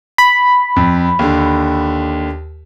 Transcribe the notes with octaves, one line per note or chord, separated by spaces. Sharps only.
B5
F2
D#2 D3